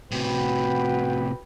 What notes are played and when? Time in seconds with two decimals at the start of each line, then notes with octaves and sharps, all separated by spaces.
0.11 A2 C3 F#4 B4 G5